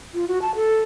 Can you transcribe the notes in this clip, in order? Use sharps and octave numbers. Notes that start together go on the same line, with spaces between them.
F4
F#4
A5
A4